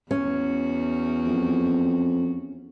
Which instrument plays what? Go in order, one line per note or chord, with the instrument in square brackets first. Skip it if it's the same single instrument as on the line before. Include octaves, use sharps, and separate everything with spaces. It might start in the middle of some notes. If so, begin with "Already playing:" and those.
[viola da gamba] E2 F#4 [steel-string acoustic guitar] C#4
[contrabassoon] F2